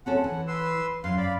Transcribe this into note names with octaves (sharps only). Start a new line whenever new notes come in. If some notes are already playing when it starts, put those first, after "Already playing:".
C4 C#4 A4 F#5
E3
B4 C6 E6
F#2 F5 C6
D5 F5 B5